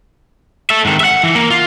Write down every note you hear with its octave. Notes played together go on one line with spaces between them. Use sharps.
A4 E5
G#2 D#3
E5 F#5
E3
A#3
F4